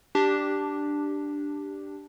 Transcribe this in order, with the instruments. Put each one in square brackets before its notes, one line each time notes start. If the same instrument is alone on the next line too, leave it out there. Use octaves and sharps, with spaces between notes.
[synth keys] D4 G4